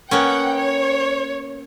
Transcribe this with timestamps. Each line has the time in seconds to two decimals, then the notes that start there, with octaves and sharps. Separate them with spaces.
0.11 A#3 B3 C#4 F#5 G5
0.55 C#5